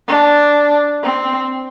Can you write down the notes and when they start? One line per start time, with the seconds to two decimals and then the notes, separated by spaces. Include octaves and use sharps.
0.08 D4
1.03 C4